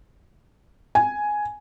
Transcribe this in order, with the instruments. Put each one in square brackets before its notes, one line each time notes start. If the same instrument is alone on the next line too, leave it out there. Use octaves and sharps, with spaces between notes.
[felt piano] G#5